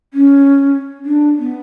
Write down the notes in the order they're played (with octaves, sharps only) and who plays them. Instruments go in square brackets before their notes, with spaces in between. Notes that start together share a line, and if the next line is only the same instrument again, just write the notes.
[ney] C#4
D4
B3